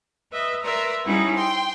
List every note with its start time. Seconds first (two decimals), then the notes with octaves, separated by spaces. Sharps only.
0.31 B4 D#5 E5
0.63 A#4 B4 D5 E5 A#5 C6
1.03 G3 C#4 D#4 E4 F#4 G#4
1.34 G5 C6